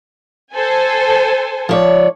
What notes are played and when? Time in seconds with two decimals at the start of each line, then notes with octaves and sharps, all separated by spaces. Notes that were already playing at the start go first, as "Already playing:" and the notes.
0.55 A4 C5 G#5
1.69 F3 C#5 D5